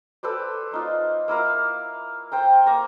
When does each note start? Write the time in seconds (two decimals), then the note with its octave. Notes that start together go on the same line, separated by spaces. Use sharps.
0.23 A4 B4 C5 D5
0.72 A#3 D#4 F4
1.28 A#3 E4 A#4 F5
2.32 C5 G5 A#5
2.66 A#3 A#5 C#6